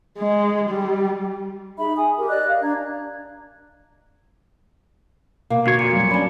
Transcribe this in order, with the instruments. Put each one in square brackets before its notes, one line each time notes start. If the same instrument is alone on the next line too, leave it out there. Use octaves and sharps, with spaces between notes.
[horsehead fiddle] G#3
G3
[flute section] D#4 G#4 E5 B5
G#5 D#6
G4 A#4
D5 D#5 F#6
F5
D4 D5 A#5 G#6
[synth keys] B2 [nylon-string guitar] A#3
[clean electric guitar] D2 C#5 [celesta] F#4 C7
[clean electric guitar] F2 A#2 [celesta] C#7
[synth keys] F#3 G3
[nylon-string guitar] C#4 D4 [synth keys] B5